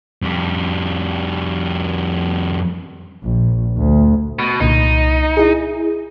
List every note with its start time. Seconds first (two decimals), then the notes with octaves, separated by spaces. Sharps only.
0.22 F2 G3
3.24 A#1
3.77 D2
4.39 B2
4.60 C2 A#2 D3 D#4
5.37 E4 G#4